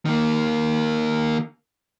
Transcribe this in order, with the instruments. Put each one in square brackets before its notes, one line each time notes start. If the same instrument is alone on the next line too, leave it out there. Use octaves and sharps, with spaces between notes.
[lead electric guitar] D#3 A#3